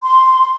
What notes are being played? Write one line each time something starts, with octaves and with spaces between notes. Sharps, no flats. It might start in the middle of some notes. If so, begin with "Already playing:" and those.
C6